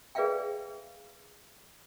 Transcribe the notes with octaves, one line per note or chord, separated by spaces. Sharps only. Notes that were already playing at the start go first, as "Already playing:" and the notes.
G#4 B4 D5 E5 F5 G5